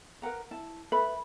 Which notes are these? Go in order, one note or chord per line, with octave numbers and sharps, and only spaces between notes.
A#4 B4 F#5 A#5
E4 A5
A4 B4 E5 B5